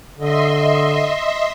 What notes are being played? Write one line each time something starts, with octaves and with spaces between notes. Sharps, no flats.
D3 D#5 E5 C6